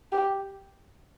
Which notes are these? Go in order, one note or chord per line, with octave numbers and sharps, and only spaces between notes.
G4